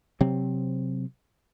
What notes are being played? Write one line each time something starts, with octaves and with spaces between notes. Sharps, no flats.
C3 F#3 C4